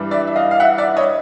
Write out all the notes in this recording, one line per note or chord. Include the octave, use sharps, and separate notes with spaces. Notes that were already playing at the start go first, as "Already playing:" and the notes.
Already playing: G2 E3 G3
D5 E5
E5
D#5 F5
F5
E5 F#5
D5 E5
C#5 D#5